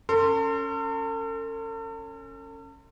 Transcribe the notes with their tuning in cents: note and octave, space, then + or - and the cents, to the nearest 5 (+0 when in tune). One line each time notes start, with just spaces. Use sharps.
C#4 +0 A4 +45 C6 +0